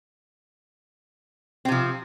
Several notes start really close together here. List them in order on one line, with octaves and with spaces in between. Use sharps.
C4 C3 F3